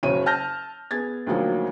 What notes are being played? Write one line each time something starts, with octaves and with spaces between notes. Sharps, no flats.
F#1 F#2 C#3 C#5 D#7
A5 F6 G6 A#6
B3 G#4 G#6 A6
D2 D#3 F3 F#3 A#3